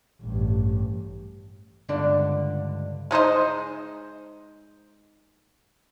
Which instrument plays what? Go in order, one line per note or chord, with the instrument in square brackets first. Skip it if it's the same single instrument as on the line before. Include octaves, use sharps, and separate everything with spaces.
[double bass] A1 G2
[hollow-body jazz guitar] C#2 G2 D3 D4
[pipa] G#3 D#4 C5 D#5